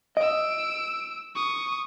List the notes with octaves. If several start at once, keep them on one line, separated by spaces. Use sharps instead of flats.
D#5 E6 D7
C#6 D#6